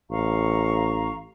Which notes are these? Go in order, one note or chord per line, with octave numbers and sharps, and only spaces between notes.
A1 F5 A#5 C#6